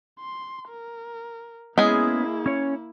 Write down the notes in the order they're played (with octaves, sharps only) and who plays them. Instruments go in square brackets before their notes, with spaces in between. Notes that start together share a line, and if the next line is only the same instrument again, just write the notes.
[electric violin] C6
A#4
[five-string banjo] G#3 G#4 [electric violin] A#3 E4 [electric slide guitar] B3 C#4
[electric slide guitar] C#4 C#5